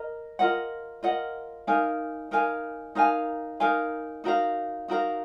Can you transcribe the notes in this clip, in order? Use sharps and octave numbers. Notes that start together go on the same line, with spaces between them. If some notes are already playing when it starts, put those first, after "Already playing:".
Already playing: A#4 D#5
F4 A#4 D#5 F#5
F4 A#4 D#5 F#5
D#4 A#4 F5 G#5
D#4 A#4 F5 G#5
D#4 A#4 F5 G#5
D#4 A#4 F5 G#5
D#4 F#4 A#4 F5
D#4 F#4 A#4 F5